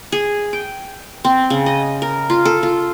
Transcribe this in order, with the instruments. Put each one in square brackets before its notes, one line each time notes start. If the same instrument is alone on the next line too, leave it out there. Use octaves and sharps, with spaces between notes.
[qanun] G#4
G5
C4
C#3
D#5
A#4
F4
A4
F4